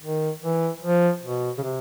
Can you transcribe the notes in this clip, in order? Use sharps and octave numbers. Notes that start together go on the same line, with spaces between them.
D#3
E3
F3
B2
C#3
C3